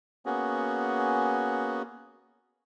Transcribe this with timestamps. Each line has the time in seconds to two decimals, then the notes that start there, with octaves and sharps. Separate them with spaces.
0.26 A#3 B3 C#4 F#4 G#4